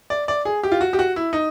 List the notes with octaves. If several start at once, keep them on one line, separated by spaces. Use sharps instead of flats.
D5
D5
G#4
G4
F4
F#4
G4
F#4
E4
D#4